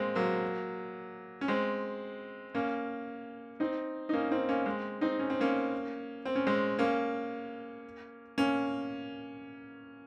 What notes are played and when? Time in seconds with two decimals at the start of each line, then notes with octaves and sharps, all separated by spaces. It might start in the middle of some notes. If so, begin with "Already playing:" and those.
Already playing: G#3 A#3 C4
0.15 F#3 A#3
1.41 C#4
1.48 G#3 C4
2.54 A#3 C#4
3.60 C4 D#4
4.09 D#4
4.13 A#3 C#4
4.31 C4 D#4
4.49 A#3 C#4
4.66 G#3 C4
5.01 C4 D#4
5.19 C#4
5.30 C4
5.40 A#3 C#4
6.25 C4
6.35 C#4
6.47 G#3 C4
6.79 A#3 C#4
8.38 A#3 C#4